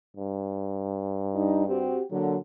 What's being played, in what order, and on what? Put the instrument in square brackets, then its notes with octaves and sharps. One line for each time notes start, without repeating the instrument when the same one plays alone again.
[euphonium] G2
[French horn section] G3 D4 D#4
C4 F#4 G4
[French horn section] A#2 D3 [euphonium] F#3